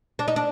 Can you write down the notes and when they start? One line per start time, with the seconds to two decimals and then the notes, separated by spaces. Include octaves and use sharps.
0.19 D4
0.28 D#4
0.36 D4